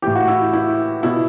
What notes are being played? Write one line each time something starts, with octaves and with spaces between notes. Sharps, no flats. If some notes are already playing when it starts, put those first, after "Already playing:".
A2 E3 G4
F#4
E4
E4
B2 E4